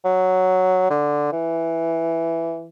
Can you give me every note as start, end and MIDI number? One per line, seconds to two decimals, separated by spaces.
0.05 0.85 54
0.90 1.31 50
1.32 2.66 52